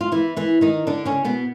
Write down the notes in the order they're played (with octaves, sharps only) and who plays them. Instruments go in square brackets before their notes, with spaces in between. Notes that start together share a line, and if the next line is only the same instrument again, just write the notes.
[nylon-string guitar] F4
E3 E4
E3 E4
D#3 D#4
D3 D4
C#3 C#4
B2 B3